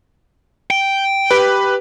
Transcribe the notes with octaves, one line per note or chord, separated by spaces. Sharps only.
G5
G4 B4